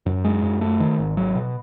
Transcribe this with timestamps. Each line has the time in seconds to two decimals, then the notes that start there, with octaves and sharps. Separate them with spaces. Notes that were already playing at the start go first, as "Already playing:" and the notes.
0.06 F#2
0.24 G#3
0.43 F#2
0.61 A3
0.80 D#3
0.99 G#1
1.17 F#3
1.35 B2